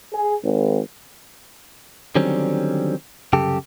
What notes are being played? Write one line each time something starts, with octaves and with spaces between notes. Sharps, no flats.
G#4
G#1
D3 D#3 F#3 G3 C4 C#4
C2 F#2 C#3 G4 A4